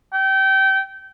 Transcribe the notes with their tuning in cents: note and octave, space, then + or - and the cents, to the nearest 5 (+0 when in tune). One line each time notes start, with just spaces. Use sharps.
G5 -25